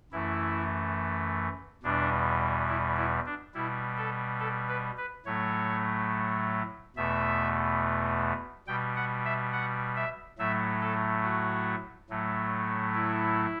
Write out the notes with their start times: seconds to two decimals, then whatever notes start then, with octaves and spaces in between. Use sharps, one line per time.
0.12 F#2 E3 A3 E4
1.83 E2 B2 G3 D4
2.69 E4
2.97 E4
3.26 D4
3.54 B2 G3 E4
3.97 A4
4.40 A4
4.68 B4
4.97 B4
5.26 A2 F#3 A3 C#5
6.96 E2 B2 A3 E5
8.67 B2 G3 G5
8.96 F#5
9.25 E5
9.53 F#5
9.96 E5
10.39 A2 F#3 A3 E5
10.81 A4
11.24 F#4
12.10 A2 F#3 A3
12.95 E4